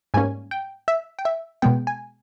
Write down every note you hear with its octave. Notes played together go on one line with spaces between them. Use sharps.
G#2 G3 A#3 C#4 G#5
G5
E5
G5
E5
B2 G#3 B3 G5
G#5